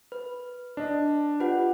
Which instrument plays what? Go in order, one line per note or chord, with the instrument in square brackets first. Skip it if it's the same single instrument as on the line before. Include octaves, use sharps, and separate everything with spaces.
[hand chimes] B4
[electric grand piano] D4 D#5
[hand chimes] F4 B4 F#5 [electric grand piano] G4